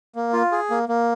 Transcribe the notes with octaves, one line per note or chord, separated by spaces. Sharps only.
A#3
F4
G#4
A#3
A#3